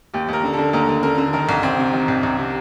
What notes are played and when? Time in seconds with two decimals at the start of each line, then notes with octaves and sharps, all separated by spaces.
0.14 D#2 G4
0.29 D#2 A#4
0.44 D3
0.53 A4
0.59 D3
0.73 D#2 A#4
0.89 D#2
1.03 D3 A#4
1.18 D3
1.33 D#3 A#4
1.49 C2
1.63 C2 C4
1.79 C3
1.93 D#3
2.08 C2
2.23 C2
2.38 C3